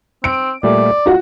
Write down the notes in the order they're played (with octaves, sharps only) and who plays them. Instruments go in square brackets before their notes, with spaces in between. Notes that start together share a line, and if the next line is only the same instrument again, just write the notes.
[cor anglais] C4 [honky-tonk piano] D7
[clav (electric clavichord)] A#2 G3 A3 [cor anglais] D5
[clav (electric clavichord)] D#4 [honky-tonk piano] F4 F#4